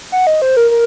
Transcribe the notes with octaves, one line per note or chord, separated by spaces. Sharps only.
F#5
D#5
C5
A#4
A#4